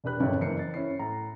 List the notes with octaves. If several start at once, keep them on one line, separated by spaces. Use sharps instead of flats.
E1 D4 G4 B4 F#6
F#1 G2 D3 C#5 G5
F#1 E3 A#3 C5 C7 C#7
A6
C#4 E4 C7
A2 A#5